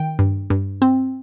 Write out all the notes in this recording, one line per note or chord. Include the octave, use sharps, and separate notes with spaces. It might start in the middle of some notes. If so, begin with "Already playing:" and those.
Already playing: D#3 G5
G2
G2
C4